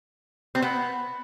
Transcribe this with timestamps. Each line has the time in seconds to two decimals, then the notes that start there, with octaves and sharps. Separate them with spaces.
0.55 C4
0.62 B3